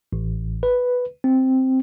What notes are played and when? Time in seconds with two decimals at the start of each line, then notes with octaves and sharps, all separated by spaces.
0.13 A1
0.63 B4
1.24 C4